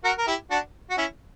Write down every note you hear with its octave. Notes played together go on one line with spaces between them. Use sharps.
F#4 A#4
A#4
E4 G4
D4 F#4
F#4
C#4 E4